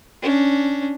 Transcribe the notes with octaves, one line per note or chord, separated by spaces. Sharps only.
C#4 D4